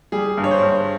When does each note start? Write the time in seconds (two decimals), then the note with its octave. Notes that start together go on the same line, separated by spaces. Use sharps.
0.12 G3 G#4
0.38 G2
0.44 C#5
0.51 C5
0.63 G2